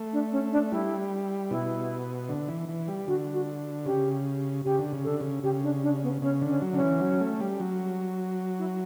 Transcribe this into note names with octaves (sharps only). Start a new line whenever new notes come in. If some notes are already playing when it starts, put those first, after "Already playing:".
Already playing: A3
D4
C#4
D4
G3 E4
B2 E4
D3
E3
E3
G3
D3 F#4
F#4
C#3 G4
C#3 G4
D3
C#3
D3 A4
C#3
C#3 G4
D4
D4
B3
C#3 C#4
D3
C#4
F#3
D3 C#4
E3
F#3
A3
G3
F#3
E4